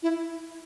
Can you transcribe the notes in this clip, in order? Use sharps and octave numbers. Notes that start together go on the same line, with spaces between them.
E4